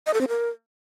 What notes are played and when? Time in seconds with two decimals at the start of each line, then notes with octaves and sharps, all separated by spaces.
0.06 D#5
0.14 A4
0.21 C4
0.28 A#4